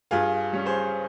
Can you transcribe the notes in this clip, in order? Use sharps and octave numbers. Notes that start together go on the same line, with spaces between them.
G2 F4 G#4
G3 C#4
G#4 C5